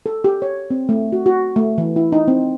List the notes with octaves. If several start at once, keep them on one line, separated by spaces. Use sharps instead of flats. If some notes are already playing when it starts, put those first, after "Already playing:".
A4
G4
C#5
C4
A3
F#4
F#4
A3
E3
E4
D#4
C4